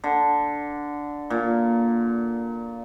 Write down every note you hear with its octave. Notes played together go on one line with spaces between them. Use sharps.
D3
A#2